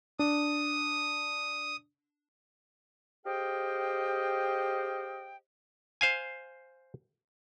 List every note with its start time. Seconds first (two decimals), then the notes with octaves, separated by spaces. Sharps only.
0.19 D4 D#6
3.25 G4 G#4 C5 D#5 F5 G5
6.01 C5 F5 G#5